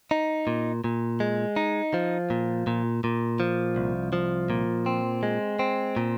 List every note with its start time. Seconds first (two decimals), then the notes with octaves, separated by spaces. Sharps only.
0.11 D#4
0.47 A#2
0.84 A#2
1.20 G#3
1.56 D#4
1.94 F3
2.30 A#2
2.67 A#2
3.04 A#2
3.40 F3
3.76 C2
4.13 F3
4.50 A#2
4.86 C4
5.23 G#3
5.59 C4
5.97 A#2